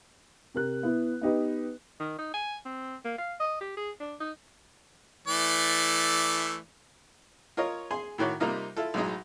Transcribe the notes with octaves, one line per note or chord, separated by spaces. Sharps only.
C3 A#4 F#6
B3 E4
B3 D#4 G4 B4
D#3
D#4
G#5
C4
A#3
F5
D#5
G4
G#4
D4
D#4
E3 A3 D5
F4 A#4 C#5 D#5
G#4 G#5 C6
A2 D#3 F#4 C#5 D6
C3 G3 A#3 D#4 F4
E4 F4 A4
B1 A2 F#3 G#3 D#4